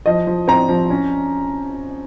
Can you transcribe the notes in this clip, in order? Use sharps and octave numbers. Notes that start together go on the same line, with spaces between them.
F3 D#5
F3
C4 A#5
F3
C#4